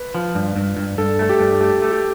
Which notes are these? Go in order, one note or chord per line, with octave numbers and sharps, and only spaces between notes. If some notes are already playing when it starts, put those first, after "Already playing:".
Already playing: B4
F3
G2
G2
G2
G2 A4
A3 A4
G4
G2
A3 G4
A3
G4